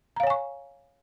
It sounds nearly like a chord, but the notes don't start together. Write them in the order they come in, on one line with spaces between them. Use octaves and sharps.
A#5 F5 C#5 G#5 C#6